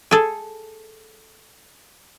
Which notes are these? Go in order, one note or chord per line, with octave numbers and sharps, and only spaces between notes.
G#4 A4